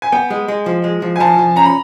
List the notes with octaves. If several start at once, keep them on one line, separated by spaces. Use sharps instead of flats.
G#5
B3 G5
G#3
G#3
F3
G#3
F3
G#5
F3 A5
F3
C#4 A#5
B5